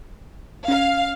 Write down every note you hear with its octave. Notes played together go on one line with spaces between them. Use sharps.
C#4 F5